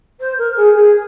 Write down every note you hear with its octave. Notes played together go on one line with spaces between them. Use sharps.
C5
A#4
G#4
G#4